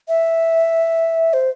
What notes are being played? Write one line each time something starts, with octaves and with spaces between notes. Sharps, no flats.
E5
C5